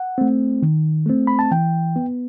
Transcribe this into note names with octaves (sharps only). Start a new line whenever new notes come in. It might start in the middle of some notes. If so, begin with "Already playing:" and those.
Already playing: F#5
A3 C4
D#3
A3 C4
B5
A5
E3 G5
B3